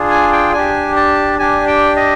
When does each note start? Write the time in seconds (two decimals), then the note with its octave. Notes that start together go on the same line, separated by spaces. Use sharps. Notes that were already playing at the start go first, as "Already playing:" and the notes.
Already playing: D4 F4 G#4
0.10 G#5
0.32 G5
0.53 D4 G4 G#5
0.96 A5
1.39 D4 G4 G#5
1.68 G5
1.96 D#5